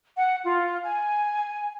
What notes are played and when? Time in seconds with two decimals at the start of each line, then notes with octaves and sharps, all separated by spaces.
0.16 F#5
0.44 F4
0.83 G#5